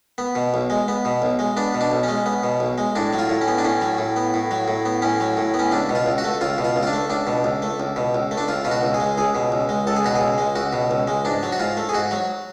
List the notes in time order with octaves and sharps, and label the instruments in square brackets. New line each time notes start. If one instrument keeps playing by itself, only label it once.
[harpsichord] B3
B2
B1
G#3
B3
B2
B1
G#3
B3 D4
B2
D4
B1
G#3 C#4
B3
B2
B1
G#3
A2 D4
F#3
F4
A2
C#4
B3
D4
A2 C#4
F#3
A2
B3
A2
F#3
A2
B3
A2 C#4
F#3
A2
B3
C#4
C#2 D4
B2
F4
C#2
F#4
A3
C#2 F4
B2
F4
C#2
F4
D4
A3
C#2 D4
B2
C#2
A3
C#2
B2
C#2
A3
D4
C#2 F4
B2 F4
F#4
C#2
G#4
G#3
C#2 G#4
B2
C#2
G#3
C#2 A4
G#4
B2 F#4
G#4
C#2
G#3
C#2 F#4
B2
C#2
G#3
G#2 D4
F#3
F#4
G#2 F4
A3
G#4
G#2 F#4
F#3